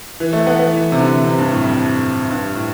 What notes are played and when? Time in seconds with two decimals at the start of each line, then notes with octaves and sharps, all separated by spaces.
0.20 E3
0.33 A3
0.47 B3
0.59 B3
0.73 E3
0.92 C3
0.99 D3
1.24 C3
1.38 G2
1.51 A2
1.64 F2
2.30 G2
2.55 A2